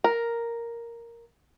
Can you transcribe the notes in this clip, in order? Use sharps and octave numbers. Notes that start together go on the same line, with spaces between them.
A#4